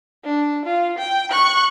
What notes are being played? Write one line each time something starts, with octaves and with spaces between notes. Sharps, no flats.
D4
F4
G5
C#6 F#6